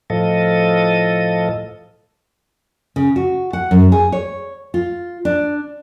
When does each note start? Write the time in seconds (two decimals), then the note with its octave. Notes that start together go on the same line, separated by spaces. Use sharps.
0.10 A2 F3 A4 D#5
2.96 C#3
3.16 F#4
3.53 F#5
3.71 F#2
3.92 G#4
4.12 C#5
4.74 F4
5.25 D4